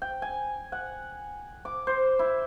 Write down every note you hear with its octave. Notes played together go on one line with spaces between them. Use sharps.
G5
G#5
F#5
D6
C5
E4